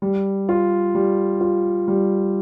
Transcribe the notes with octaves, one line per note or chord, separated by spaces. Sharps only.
G3
F4
G3
F4
G3